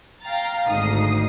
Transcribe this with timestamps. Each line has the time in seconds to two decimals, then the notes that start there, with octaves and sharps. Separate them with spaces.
0.23 F5 G5 A#5 A6
0.69 G#1 D2 G#2 D#4 D#6 C7